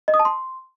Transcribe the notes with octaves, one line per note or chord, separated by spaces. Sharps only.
D#5
D#6
A5
C6